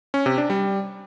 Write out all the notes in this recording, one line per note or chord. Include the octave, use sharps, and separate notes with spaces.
C#4
C3
D4
G3